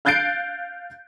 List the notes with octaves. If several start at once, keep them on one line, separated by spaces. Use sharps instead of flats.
F5 F#6 G6 A6 C7 D7